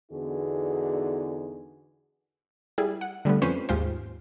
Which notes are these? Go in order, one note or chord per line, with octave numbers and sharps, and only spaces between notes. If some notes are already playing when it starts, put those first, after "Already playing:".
E2 D3 B3 D#4 F#4 G#4
G3 E4 G#4
F#5
D3 G3 A3 B3
F2 C#4 B4 C5 C7 D#7
D#2 G#2 G#3 F4 G4 C5